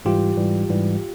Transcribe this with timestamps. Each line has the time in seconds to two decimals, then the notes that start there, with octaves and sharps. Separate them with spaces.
0.05 G#2 E3 G3 F4 G4
0.37 G#2 E3 G3
0.69 G#2 E3 G3